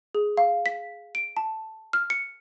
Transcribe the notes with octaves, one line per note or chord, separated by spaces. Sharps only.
G#4
F5
B6
D7
A5
F6
C#7